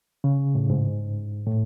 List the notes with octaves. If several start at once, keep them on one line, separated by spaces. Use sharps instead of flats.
C#3
A2
G#2
A2